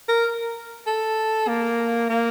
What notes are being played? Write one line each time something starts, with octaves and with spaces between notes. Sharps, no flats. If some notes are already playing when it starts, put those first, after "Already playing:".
A#4
A4
A#3
A#3